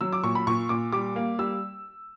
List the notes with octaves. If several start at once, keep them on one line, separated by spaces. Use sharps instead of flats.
F#3 E6
D6
A#2 C#6
B5
A#2 C#6
A#2 D6
G3 D6
A#3
G3 E6